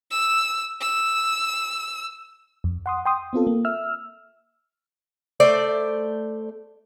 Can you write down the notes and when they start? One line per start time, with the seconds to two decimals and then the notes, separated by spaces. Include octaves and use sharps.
0.11 E6
0.81 E6
2.64 F2
2.86 F#5 C6 D#6
3.05 G5 C6 D#6
3.33 B3 C4 F4 A4
3.47 A#3
3.65 E5 E6 F6
5.40 A3 C5 D5 E5